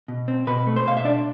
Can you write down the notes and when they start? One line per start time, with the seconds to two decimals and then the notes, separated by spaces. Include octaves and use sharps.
0.08 B2
0.28 C4
0.47 B2 B4
0.67 A3
0.76 C5
0.86 B2 F5
0.97 E5
1.05 D4 D5